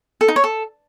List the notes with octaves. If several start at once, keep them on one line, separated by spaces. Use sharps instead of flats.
A4
D#4
C#5
A4